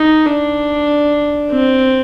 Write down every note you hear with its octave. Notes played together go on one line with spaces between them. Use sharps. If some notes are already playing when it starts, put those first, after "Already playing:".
Already playing: D#4
D4
C4